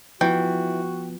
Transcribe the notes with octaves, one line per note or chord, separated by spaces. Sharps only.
E3 F3 B3 F#4 G5